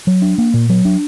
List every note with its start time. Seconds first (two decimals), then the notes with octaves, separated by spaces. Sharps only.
0.07 F#3
0.22 D4
0.38 A#3
0.54 A#2
0.69 F#3
0.85 D4